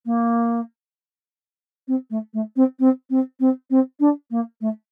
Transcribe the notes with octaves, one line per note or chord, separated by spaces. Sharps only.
A#3
C4
A3
A3
C4
C4
C4
C4
C4
D4
A#3
A3